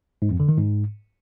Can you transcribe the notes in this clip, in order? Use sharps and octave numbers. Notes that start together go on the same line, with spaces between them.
G#2
F2
D3
D#3
G#2